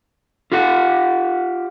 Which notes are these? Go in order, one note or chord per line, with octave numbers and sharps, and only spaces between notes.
F4 G4 F5 F#5